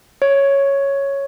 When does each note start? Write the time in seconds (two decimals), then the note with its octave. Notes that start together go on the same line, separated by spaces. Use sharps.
0.22 C#5